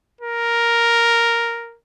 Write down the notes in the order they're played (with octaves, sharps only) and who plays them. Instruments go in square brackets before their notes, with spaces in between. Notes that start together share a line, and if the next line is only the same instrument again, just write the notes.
[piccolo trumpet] A#4